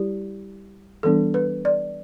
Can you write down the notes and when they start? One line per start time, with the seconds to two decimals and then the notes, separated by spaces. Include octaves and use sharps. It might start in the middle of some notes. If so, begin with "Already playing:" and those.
Already playing: G3 E4 G4
1.03 E3 G3 B3 D4 A4
1.34 B4
1.65 D5